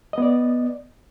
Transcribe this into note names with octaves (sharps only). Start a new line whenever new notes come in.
B3 D5 D#5